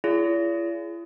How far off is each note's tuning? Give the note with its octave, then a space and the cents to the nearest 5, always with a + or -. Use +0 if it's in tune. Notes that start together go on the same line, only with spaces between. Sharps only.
E4 +45 G#4 +10 D5 -45